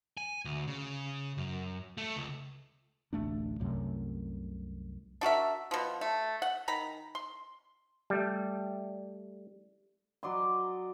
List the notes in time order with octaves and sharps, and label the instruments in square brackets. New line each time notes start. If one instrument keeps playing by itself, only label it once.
[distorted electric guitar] G#5
D2
C#3
F#2
A3
C#2
[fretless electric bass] D1 A1 A3 D4
C2 F#2 C3 A3
[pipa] D4 F#4 A#4 E5
B2 F3
A3
F#5
D#3 A#5 B5
C6
[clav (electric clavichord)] G3 A3
[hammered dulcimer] F#3 D5 D#5 C6